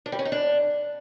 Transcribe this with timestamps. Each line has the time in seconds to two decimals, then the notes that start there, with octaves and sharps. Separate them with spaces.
0.06 D4
0.12 G3
0.19 C#4
0.25 D#4
0.32 D4